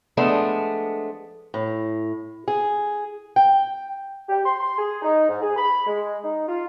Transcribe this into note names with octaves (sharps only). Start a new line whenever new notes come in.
F3 G#3 A3 B3 D4
A2
G#4
G5
G4
C6
C6
G#4
D#4
G#2
G#4
B5
G#3
D#4
F4